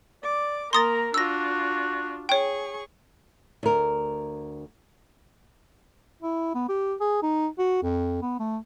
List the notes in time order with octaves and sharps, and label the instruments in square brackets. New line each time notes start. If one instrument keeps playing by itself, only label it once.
[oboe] D5 [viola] D6
[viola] A#3 A#4 [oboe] A#5 [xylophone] C6 D#6 A6
[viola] D4 F4 [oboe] F#4 [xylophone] E6 A#6
[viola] G#4 C#6 [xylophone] C#5 G5
[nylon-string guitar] D2 A#4
[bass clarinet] E4
B3
G4
G#4
D#4
F#4
F2
B3
A3